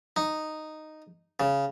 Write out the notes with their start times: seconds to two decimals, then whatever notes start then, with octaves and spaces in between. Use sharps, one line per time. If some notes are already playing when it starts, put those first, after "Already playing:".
0.16 D#4
1.40 C#3